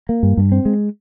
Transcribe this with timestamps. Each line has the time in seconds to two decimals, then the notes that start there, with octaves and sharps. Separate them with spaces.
0.09 A#3
0.23 G2
0.37 G2
0.52 C4
0.65 G#3